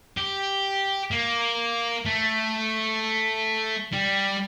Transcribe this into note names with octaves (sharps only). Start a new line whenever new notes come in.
G4
A#3
A3
G3